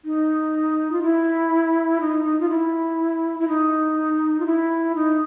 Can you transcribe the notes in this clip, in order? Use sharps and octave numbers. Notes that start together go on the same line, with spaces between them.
D#4
F4
E4
D#4
D#4
F4
E4
E4
D#4
F4
E4
D#4